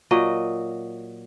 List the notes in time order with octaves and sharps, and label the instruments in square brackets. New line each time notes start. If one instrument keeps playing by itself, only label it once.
[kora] A#2 F#3 D#5